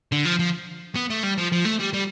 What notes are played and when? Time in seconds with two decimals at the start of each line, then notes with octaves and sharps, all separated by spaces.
0.12 D3
0.25 F3
0.39 F3
0.95 B3
1.10 A3
1.23 G3
1.38 F3
1.52 F3
1.65 A3
1.80 G3
1.93 G3